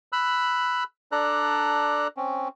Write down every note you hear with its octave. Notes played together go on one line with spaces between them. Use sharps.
B5 E6 F#6
D4 A4 D5 A#5 F#6
C4 C#4